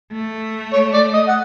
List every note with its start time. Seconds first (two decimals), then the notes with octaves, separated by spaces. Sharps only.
0.12 A3
0.73 C#5
0.94 D5
1.14 D#5
1.28 F#5